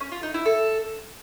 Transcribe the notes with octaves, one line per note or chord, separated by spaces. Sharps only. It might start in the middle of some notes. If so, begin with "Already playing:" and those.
C#4
F4
D#4
E4
A4